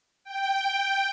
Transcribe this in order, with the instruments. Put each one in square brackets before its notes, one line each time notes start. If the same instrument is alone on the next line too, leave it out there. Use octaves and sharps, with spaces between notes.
[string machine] G5